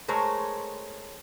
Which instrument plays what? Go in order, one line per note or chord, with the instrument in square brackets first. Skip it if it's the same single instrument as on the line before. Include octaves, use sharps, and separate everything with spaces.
[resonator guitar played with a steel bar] G#3 A3 A#4 C5 C#5